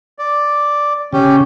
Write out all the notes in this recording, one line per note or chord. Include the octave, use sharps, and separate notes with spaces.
D5
C#3 C#4 G4